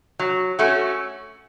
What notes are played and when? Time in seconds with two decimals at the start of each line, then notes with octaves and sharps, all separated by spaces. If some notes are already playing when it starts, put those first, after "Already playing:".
0.19 F#3
0.59 A3 C#4 F#4